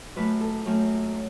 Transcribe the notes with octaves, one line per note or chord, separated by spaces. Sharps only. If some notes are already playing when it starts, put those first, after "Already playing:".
F#2 F#3 A3 B4
A4
F#2 F#3 A3